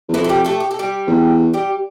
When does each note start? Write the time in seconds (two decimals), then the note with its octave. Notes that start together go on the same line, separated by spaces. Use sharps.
0.09 E2
0.14 F2 E3 E4
0.24 A4
0.29 G3 G4
0.45 A3 A4
0.60 G4
0.71 A4
0.79 G3 G4
1.08 E2
1.53 G3 G4